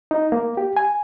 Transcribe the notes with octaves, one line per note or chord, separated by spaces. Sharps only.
D#4
A#3
G4
G#5